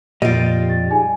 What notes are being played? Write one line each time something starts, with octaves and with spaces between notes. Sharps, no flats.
F2 A#2 G3 F4 D#5 A#6 D7
G4 A6
D#4 G#4 G#5